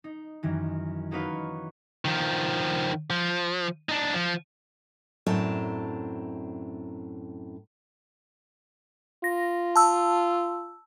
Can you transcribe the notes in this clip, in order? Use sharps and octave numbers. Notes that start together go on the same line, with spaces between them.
D#4
F#2 D#3 E3
A#3 D#4 F#4 B4 C#5 F5
D#3 F3
F3
D4 D#4
F3
F#2 A2 C4 D4 A#4 A5
F4 A#6
A5 E6